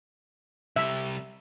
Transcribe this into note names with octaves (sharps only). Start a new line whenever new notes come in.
C3 G3 E5